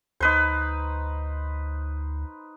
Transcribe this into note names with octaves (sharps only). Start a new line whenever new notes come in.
D2 D#4 B4 C5